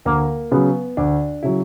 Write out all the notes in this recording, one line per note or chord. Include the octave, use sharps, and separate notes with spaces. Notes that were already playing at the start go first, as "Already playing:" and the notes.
D2 A#3
C#3 F#3 B3
D2 D4
C#3 F#3 E4